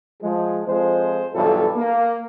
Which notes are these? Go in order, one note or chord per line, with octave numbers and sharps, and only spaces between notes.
F3 G#3
F2 F3 G#3 C5
B1 G2 E3 F4 A4
A#3